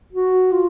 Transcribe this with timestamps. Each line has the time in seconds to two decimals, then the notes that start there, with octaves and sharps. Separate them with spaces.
0.13 F#4
0.51 F4